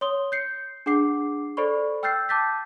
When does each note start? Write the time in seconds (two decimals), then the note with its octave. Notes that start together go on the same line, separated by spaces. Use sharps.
0.01 C#5 C6 D#6 G7
0.32 G6 C7 C#7
0.86 D4 G#4 F#5 D6 C7
1.57 A4 C5 D5 B5 C#6
2.03 G5 E6 F6 G6 A6 C7
2.29 A5 D6 G6 A6 B6